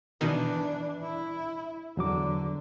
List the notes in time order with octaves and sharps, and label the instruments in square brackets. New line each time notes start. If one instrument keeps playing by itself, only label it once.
[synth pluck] B2 D#3 [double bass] E3 D4
[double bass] E4
[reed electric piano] E2 F#3 D6 [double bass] D3